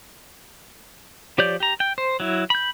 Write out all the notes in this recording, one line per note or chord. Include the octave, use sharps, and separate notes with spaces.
F3 G4 C#5 D5 G6
G4 A#5
G5
C5
F#3 E4
B5 G6